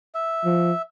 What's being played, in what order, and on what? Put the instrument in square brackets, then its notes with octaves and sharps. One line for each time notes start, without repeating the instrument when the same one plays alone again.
[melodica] E5
[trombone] F3